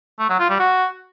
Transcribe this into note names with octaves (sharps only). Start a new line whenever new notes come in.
A3
F#3
F4
G3
F#4